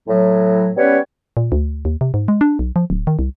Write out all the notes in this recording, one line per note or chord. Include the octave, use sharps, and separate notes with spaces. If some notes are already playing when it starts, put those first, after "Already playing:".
A2 F#3
G3 B3 C#4 B4 C#5
A#2
D2
D#2
C3
G#2
G#3
D4
B1
F3
D1
D#3
C2